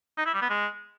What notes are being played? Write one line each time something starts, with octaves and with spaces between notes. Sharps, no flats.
D#4
E4
G3
B3
G#3